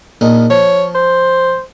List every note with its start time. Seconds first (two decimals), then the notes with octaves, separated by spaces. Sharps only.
0.21 A#1 A#2 D#4
0.50 F3 C#5
0.95 C5